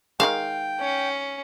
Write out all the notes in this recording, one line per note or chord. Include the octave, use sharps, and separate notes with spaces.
D#3 F3 G#3 F5 G5
C#4